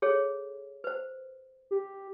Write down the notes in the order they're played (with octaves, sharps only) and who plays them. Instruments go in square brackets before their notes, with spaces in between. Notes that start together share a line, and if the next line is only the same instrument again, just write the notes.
[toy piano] G#4 A4 C#5
B4 C5
[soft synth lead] G4